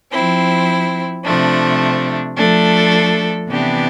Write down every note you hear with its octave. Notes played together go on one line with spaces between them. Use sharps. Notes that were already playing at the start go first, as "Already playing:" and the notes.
F3 C4 E4
C3 F3 A3 D4
F3 A3 D4 A4
C3 E3 B3 D4 G4